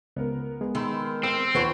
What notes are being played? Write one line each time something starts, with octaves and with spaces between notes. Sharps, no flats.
C#2 B3 A#4
G#3 B3 G#4
D#3 B5 C6 E6
C4 E6
D#2 F3 B4 C#5 F#5